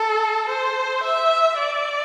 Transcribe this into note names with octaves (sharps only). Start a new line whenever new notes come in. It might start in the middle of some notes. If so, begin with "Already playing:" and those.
Already playing: A4
C5
E5
D5